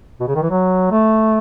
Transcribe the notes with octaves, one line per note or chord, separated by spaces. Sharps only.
B2
C#3
D#3
E3
F#3
A3